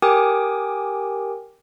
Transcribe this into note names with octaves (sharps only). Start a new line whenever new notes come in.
G4 A#4 G5 G#5 D6 D#6